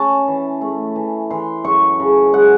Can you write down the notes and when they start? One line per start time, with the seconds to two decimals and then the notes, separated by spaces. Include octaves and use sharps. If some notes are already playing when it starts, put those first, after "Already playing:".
Already playing: C#4 A5
0.28 E3
0.61 A3
0.96 E3
1.31 E3 C6
1.64 F#2 C#6
2.00 C#3
2.33 G#3 F#5